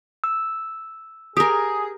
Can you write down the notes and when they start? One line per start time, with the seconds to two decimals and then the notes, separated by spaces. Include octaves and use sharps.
0.24 E6
1.37 G4 G#4 A#4 D#6